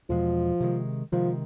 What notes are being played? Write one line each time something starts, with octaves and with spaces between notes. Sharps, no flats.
E2 B2 F3 G#3
C3 D#3 G#3
C3 D#3 F3 G#3